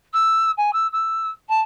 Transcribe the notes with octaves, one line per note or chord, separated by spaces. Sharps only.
E6
G#5
E6
E6
A5